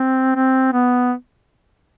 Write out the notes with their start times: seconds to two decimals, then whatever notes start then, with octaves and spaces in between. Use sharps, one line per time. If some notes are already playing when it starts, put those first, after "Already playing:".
Already playing: C4
0.35 C4
0.73 B3